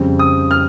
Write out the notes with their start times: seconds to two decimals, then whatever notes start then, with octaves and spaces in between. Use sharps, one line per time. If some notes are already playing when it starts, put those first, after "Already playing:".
Already playing: F2 C#3 G3 C4
0.19 D#6
0.51 F6